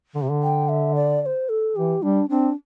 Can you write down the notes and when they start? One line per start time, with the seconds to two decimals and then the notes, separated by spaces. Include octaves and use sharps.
0.15 D3
0.22 C3
0.30 D3
0.43 G5
0.69 E5
0.95 D5
1.22 D5
1.26 C5
1.49 A4
1.76 E3 G4
2.02 G3 D4
2.30 C4 D4